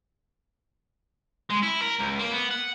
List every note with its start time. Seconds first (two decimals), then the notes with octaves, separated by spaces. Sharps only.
1.50 G#3
1.63 E4
1.82 A#4
2.00 C#2
2.19 A#3
2.32 B3
2.51 F#5